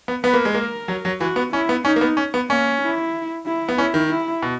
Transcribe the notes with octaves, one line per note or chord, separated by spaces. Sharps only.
B3
B3 B4
A#3
G#3
A#3 A#4
F#3
F#3
E3 F#4
B3
C#4 E4
B3
C#4 D#4
A#3
B3
C#4
B3
A#3 C#4
E4
E4
B3
C#4 E4
D#3
E4
B2